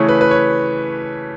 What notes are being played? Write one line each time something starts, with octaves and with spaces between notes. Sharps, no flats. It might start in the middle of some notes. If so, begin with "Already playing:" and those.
Already playing: C#3 E3 A3 C#5
B4
B4
C#5